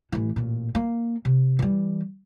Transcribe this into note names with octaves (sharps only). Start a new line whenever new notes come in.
A1 E3
A1 A#2
A#3
C3
E3 G3